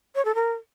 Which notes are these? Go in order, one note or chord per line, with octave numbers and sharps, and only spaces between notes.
C#5
A4
A#4